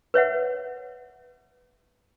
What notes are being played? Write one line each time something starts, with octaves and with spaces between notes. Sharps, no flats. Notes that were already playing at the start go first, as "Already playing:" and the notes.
B4 C#5 E5 F#5